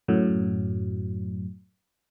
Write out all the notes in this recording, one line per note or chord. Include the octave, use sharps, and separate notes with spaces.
F#2 A2 F#3